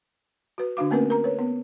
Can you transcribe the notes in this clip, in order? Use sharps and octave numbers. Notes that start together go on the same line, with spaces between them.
F#4 B4
D3 D4 F#4 F5 D6
A3 A#3 C4 C#4 A#4 B4
A#4 A#5
B4 C#5
B3